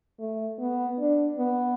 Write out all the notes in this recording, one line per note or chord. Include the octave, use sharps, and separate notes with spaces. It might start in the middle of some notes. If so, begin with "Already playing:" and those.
A3
B3
D4
B3